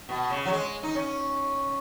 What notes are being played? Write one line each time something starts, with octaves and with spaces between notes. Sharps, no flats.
B2
C#3
F#3
G#3
D#4
C#4